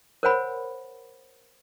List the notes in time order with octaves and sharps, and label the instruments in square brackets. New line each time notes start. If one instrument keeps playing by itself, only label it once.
[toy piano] A#4 C5 C#5 F#5 G#5 B5